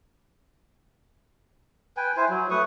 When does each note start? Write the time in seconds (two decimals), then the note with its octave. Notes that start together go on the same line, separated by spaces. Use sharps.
1.97 B4 G5 G#5
2.17 E4 C5 G#5
2.29 F#3
2.51 A3 B4 C#6 D#6